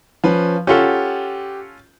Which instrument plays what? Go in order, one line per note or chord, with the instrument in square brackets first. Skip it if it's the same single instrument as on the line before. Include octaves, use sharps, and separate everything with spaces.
[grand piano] F3 C#4 B4
[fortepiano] C#4 F4 A4 [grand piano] G4 F#5